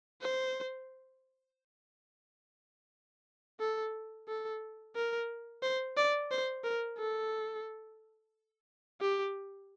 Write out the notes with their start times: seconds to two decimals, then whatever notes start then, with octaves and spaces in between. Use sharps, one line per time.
0.22 C5
3.60 A4
4.28 A4
4.96 A#4
5.63 C5
5.97 D5
6.31 C5
6.64 A#4
6.98 A4
9.01 G4